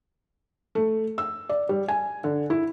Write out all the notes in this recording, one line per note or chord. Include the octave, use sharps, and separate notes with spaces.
A3
E6
D5
G3
G#5
D3
E4